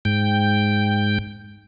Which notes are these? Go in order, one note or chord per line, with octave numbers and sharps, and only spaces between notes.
G#2 G5